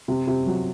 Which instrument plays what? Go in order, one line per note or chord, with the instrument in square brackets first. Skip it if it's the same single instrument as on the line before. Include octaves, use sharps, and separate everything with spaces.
[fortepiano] C3
C3
F#3